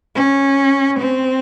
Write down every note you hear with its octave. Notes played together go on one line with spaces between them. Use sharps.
C#4
C4